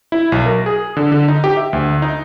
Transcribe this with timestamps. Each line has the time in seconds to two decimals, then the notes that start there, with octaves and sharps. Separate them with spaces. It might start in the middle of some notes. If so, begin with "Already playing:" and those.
0.12 E4
0.32 B1
0.46 A#4
0.66 G#4
0.97 D3
1.12 D3
1.28 D#4
1.44 G4
1.57 E5
1.73 D2
2.02 D#4